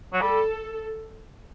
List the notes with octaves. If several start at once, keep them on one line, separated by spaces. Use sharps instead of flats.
F#3
G3 A4